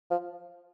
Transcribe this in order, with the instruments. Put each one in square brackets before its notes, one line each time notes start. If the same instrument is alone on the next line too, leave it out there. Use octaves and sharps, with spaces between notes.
[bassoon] F3